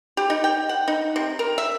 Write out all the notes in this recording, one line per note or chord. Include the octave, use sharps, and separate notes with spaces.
G4
D#4
G5
F#5
D#4
C3
A#4
E5